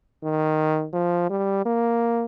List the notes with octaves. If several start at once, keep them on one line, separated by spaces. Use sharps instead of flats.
D#3
F3
G3
A#3